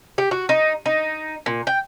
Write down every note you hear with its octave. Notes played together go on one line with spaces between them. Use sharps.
G4
F#4
D#4
D#4
A#2
G5